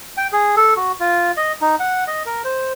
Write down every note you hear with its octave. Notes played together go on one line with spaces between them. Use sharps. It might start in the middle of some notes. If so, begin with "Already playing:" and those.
G5
G#4
A4
F#4
F4
D#5
D#4
F#5
D#5
A#4
C5